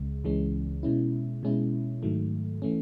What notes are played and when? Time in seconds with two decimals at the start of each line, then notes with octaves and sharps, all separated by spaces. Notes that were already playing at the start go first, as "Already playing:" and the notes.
Already playing: C#2 C#3 G#3
0.24 C#2 C#3 E3 G#3 C#4
0.83 B2 G#3 C#4 E4
1.43 B2 G#3 C#4 E4
2.03 G#2 D#3 F#3 A3
2.62 E3 A3 C#4